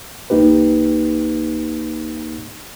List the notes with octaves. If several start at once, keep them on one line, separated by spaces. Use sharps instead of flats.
C2 A#3 D#4 G4 B4